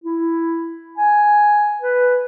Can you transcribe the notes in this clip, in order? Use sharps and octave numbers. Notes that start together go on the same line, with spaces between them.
E4
G#5
B4